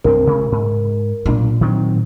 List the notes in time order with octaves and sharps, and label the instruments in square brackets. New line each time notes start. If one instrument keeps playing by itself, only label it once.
[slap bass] C2 G2 C4 [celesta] A#4
[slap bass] A1 C3 G#3
G#2
[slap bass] B1 D4 [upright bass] A#2
[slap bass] D#3 F#3 C4